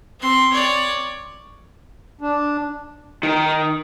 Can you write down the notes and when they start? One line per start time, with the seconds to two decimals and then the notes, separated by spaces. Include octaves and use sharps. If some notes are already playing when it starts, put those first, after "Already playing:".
0.20 C4 C6
0.52 C#5 D5
2.21 D4
3.23 D#3